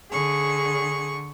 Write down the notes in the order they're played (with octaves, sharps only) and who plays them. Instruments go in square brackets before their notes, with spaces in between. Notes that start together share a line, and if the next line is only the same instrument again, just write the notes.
[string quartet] D3 C#6 [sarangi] G#4